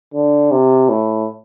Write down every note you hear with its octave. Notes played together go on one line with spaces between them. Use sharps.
D3
C3
A2